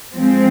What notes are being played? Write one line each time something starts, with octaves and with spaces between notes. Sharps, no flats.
F3 G#3 C4